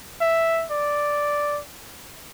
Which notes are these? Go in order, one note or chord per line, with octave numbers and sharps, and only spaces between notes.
E5
D5